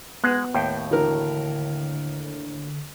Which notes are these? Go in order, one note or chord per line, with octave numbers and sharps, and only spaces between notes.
G#3 B3 F#5 F#6
D#2 A2 G5
D3 E3 F#4 A#4